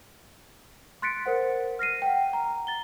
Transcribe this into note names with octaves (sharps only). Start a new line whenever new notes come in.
C6 F#6 A6 B6 C#7 D7
A#4 C5 F#5
F6 A#6 C7 D#7
F#5 G5
A#5
A6 G7